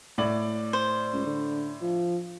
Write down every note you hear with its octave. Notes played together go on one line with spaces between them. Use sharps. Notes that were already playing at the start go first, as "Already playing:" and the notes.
A2 D5 F#7
C5
C#2
D3
F3